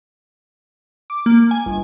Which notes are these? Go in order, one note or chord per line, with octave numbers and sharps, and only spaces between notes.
D6
A#3
G#5
G1